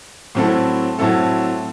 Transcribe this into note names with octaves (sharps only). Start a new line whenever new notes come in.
A2 F#3 C4 E4 A4
A2 F#3 C4 E4 A4